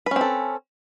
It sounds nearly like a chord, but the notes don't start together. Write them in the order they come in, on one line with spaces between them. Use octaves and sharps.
B4 C#4 C4 A4